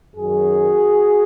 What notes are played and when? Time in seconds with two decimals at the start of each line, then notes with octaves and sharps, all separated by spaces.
0.16 F#2 D#3 F#3 F#4 G#4